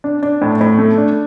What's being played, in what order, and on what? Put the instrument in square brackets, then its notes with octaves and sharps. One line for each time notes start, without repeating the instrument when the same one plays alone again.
[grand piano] D4
D4
A2
A2
A3
D4